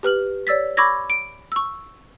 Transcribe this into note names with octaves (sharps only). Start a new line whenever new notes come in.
G4 B4 F6 F#7
C#5 D5 E6 A6 B6
B5 C#6 D6 E6 G#6 A#6
D7
C#6 E6